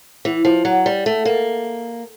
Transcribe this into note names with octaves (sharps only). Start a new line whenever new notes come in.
E3
F3
F#3
G3
A3
A#3